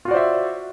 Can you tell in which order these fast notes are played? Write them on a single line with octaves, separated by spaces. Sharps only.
F4 F#4 D5 C5 E5